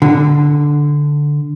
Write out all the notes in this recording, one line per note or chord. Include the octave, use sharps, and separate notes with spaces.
D3